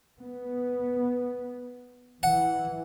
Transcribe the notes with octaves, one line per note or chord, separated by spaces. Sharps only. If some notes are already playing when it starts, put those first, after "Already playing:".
B3
E3 F#5